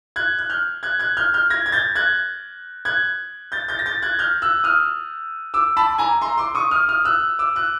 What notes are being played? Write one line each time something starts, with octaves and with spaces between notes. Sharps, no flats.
F#6 G#6
F#6
F6 G6
F#6 G#6
F#6 G#6
F6 G6
F6 G6
G#6 A#6
G#6
G6 A6
F#6 G#6
F#6 G#6
G6 A6
G6 A6
A#6
G6 A6
F#6 G#6
F6 G6
E6 F#6
D#6 F6
D6 E6
A5 B5
G#5 A#5
A#5 C6
C6 D6
C#6 D#6
D#6 F6
D#6 F6
E6 F#6
D6 E6
E6 F#6